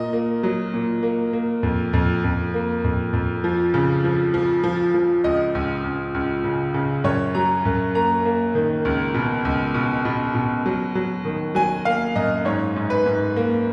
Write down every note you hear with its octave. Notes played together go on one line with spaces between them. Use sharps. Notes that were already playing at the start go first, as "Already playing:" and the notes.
Already playing: A#2 D#5
A#3
F#3
A#2
A#3
A#3
F2
F2
F2
A#3
F2
F2
F3
C#3
F3
F3
F3
F3
C#2 D#5
C#2
C#2
C#2
C#3
C#3
F#2 C#5
F#3 A#5
F#2
A#3 A#5
A#3
D#3
C#2
B2
C#2
B2
B2
B2
F#3
F#3
D#3
F#3 G#5
A#3 F5
F#2 D#5
G#2 C#5
G#2
B4
G#2
A#3